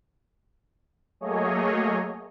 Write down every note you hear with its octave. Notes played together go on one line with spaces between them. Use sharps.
F#3 A3 A#3 G#4 C#5 D#5